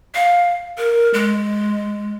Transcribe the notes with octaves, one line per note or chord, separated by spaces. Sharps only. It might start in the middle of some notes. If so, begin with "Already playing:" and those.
F5
A#4
G#3